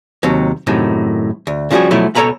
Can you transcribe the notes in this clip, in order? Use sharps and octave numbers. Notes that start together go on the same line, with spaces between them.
D#2 C3 F#3
F#2 A2 C3 D#3
D2
C#3 F3 G3 D#4 F#4 G#4
B2 F3 F#3 A3 E4
C#2 B2 A4 C#5 A#5 B5